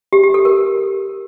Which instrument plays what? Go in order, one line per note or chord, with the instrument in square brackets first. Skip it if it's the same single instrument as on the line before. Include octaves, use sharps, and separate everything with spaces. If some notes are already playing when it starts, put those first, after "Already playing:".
[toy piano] G4
G4
A4
A#4